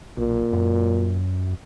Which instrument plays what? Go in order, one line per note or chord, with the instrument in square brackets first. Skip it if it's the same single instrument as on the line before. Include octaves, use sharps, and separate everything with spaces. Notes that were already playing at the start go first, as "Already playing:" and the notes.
[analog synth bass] B1 [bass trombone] A#2
[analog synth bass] F#2